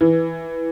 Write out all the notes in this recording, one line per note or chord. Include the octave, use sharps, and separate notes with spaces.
E3